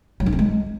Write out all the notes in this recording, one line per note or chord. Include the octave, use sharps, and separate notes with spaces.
F#3
D4
C4
G#3